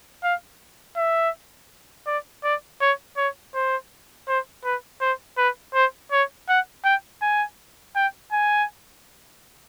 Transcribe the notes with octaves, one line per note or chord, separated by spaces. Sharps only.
F5
E5
D5
D5
C#5
C#5
C5
C5
B4
C5
B4
C5
C#5
F#5
G5
G#5
G5
G#5